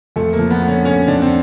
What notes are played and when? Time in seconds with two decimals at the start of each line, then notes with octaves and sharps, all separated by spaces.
0.16 F2 A3
0.33 A#3
0.39 F3
0.51 B3
0.62 D3
0.68 C#4
0.85 D3 C#4
1.08 F2 D4
1.22 C4